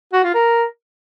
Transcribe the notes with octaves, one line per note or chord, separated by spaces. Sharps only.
F#4
F4
A#4